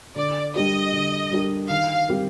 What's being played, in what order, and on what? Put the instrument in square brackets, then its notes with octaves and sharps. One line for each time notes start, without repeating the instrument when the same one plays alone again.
[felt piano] D3 [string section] D5
[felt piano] G3 D4 G4 A#4 [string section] D#5
[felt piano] D3
G3 D4 G4 A#4
[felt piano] D#3 [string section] F5
[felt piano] G3 C4 G4 A#4